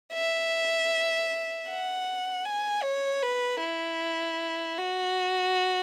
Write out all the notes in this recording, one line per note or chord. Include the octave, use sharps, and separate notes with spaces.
E5
F#5
G#5
C#5
B4
E4
F#4